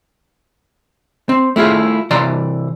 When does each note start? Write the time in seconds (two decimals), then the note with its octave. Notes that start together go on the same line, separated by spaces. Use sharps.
1.29 C4
1.56 A3 E4 F4 G#4
2.11 C3 E3 D5 A#5 C6